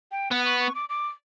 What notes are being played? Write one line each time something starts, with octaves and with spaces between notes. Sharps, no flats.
G5
B3 F#5
C#6
C#6
D6
D6